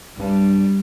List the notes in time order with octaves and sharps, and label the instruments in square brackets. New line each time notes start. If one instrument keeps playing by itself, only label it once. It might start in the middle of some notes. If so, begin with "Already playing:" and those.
[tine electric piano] B1 G2 D4 [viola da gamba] G3